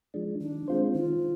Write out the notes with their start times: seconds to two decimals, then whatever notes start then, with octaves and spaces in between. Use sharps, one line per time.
0.14 F3 G#3 D4
0.41 D#3 D4
0.68 G#3 C4 F4 C5
0.95 D#3 F4